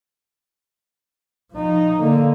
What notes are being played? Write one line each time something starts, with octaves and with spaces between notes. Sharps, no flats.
F3 D#4
D3 A#3